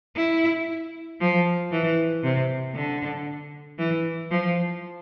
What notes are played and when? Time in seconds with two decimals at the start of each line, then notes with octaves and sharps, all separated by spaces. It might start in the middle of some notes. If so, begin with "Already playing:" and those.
0.16 E4
1.21 F3
1.72 E3
2.24 C3
2.75 D3
3.79 E3
4.31 F3